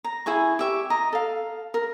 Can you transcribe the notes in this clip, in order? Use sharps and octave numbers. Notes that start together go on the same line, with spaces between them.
A#5
E4 G#4 G#5 C#6
G4 E5 C#6
D#5 A#5
A4 F5
A#4